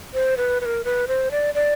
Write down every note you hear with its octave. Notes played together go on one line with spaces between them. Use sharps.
C5
B4
B4
A#4
B4
C5
D5
D5